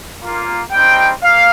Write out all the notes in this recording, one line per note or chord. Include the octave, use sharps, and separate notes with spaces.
A#3 F4
G3 C4 D#4 G5
A#3 F5